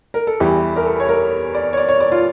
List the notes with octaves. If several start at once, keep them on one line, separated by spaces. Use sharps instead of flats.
A#4
A4
E2 E3 G3 G4
A#4
A4
C#5
A#4
D5
C#5
D5
C#5
D5
F4